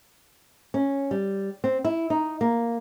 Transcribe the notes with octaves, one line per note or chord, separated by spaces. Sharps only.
C#4
G3
C4
E4
D#4
A#3